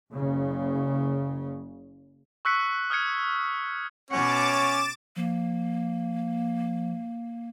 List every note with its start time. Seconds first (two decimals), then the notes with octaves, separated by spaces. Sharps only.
0.10 F#1 C#3
2.45 C#6 E6 F#6 B6 C#7
2.90 D#6 F6 F#6 G#6 C#7
4.11 B2 C#4 C#5 F#5 D6 A6 E7
5.16 F3 A#3